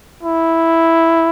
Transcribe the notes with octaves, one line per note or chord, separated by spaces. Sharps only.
E4